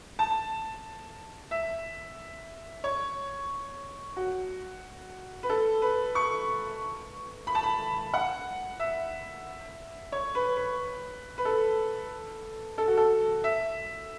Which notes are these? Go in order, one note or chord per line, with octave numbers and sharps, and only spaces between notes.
A5
E5
C#5
F#4
B4
A4
B4
C#6
B5
A5
B5
F#5
E5
C#5
B4
B4
B4
A4
A4
F#4
A4
E5